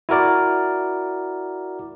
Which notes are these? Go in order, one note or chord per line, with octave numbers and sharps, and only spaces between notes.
E4 F#4 A#4 D5